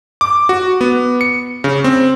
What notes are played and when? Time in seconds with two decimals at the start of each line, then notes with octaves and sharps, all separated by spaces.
0.21 D6
0.49 F#4
0.81 B3
1.21 C#7
1.64 C#3
1.84 C4